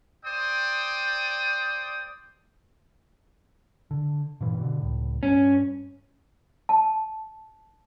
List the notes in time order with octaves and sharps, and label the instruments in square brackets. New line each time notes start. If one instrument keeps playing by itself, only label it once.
[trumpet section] C5 D5 G5 D#6
[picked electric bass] D3
G2 A#2 E3
B2 D3
C#2 A2
[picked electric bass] G2 [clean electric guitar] C#4
[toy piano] A5